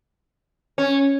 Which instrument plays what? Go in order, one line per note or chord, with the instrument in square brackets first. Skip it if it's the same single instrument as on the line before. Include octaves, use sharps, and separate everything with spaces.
[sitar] C#4